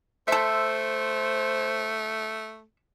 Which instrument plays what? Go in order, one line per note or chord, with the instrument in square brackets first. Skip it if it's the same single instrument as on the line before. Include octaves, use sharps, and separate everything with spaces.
[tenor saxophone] A3 [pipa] A4 E5 [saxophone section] C5